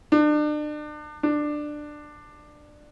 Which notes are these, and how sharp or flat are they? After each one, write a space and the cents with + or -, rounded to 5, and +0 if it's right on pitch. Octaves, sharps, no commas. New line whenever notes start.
D4 +35
D4 +15